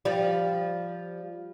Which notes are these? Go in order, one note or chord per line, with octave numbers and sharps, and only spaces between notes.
F3 G3